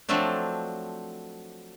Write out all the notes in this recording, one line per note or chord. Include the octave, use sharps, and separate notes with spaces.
F3 F#3 A3 C4 D4